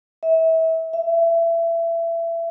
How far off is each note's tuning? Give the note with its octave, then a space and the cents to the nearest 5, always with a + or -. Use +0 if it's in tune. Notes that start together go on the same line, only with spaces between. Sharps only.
E5 -30
E5 +25